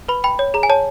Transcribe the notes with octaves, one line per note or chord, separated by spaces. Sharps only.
B4 B5
G5 B5
C#5
G#4 A#5
G#5
C#5 A5